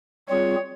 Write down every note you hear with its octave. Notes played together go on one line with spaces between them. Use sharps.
G3 C4 F4 G#4 C#5